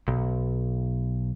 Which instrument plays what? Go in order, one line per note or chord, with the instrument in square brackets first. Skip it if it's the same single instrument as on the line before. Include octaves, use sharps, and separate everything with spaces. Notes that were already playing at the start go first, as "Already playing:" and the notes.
[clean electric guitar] B1